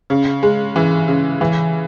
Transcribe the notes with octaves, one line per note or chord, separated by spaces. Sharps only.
C#3
G#3
E3
C#3
E3